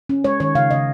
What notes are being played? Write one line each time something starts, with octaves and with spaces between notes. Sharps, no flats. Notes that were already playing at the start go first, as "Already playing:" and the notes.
C#4
G#3 C#5
D#3 C#5
C#3 F5
C#3 D#5